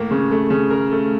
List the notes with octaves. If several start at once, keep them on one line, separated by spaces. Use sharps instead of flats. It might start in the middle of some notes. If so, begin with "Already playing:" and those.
Already playing: A2 A#3
C#3
A3
C#3
A#4
A3